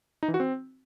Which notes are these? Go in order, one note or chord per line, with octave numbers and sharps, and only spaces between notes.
D#4
E3
F#4
C4